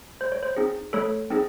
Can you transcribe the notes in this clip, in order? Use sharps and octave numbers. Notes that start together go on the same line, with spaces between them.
A3 C5
C#5
C5
C4 D#4 G#4
A3 A4 C#5
C4 D#4 G#4